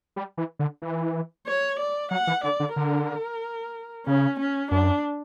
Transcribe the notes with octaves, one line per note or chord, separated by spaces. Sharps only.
G3
E3
D3
E3
C#5
D5
F#3 F#5
E3
D3 D5
D3
D3 A#4
C#3 C#4
C#4
F#2 D4